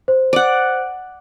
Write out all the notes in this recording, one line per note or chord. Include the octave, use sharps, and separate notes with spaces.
C5
D5 F#5